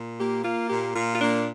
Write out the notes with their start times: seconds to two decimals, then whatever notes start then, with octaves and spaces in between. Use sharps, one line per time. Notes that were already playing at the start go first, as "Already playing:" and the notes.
Already playing: A#2
0.18 A#3 G4
0.43 A#3 F4
0.70 A#2 G4
0.95 A#2 F4
1.15 F4
1.20 A#3 D4